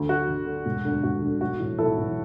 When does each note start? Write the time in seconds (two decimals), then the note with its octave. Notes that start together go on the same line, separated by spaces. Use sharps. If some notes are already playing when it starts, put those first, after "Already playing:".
Already playing: D2
0.09 D3 F#4
0.28 D2
0.47 D3
0.66 E1
0.85 D2 D3
1.03 E1 F#4
1.22 D2 D3
1.41 B1 F#4
1.60 A2 E3
1.78 B1 E4 A4
1.97 A2 E3